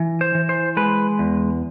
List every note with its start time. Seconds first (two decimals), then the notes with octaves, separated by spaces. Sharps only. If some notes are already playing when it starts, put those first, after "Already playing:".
Already playing: E3
0.21 C5
0.35 E3
0.49 C5
0.77 G#3 B4
1.19 E2